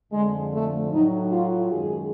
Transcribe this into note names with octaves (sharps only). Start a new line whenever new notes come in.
F2 D3 F3 G#3
A3
A2 F#3 D#4
F4
F#2 D#3 G#3 G#4